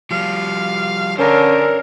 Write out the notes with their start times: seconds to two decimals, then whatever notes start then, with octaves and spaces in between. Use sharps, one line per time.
0.11 F3 G3 F5
1.19 D3 C#4 A#4 C5 C#5